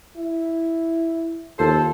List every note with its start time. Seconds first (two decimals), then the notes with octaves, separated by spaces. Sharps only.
0.16 E4
1.59 D#2 F4 A4 C5